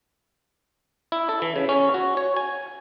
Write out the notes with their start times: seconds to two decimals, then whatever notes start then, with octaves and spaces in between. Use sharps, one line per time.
1.12 E4
1.29 A4
1.42 E3
1.56 C#3
1.69 C#4
1.94 F#4
2.17 C#5
2.36 G#5